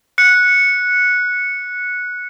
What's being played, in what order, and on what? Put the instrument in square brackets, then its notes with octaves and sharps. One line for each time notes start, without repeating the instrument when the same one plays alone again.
[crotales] F#6 C#7